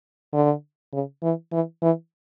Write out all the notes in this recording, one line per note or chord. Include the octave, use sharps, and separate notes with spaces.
D3
C#3
E3
E3
E3